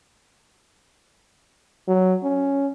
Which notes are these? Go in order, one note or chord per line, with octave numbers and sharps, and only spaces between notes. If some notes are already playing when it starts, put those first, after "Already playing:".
F#3
C#4